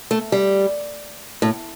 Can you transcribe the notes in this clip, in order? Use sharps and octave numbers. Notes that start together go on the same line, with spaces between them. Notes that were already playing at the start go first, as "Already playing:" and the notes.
A3
G3
A2